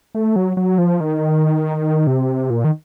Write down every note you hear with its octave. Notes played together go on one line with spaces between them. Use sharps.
A3
F#3
F#3
F3
D#3
C3
A#2
D#3